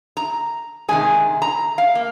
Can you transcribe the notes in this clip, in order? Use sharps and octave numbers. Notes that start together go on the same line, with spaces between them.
A#5
C3 D#3 G#3 G#5
A#5
F5
A#3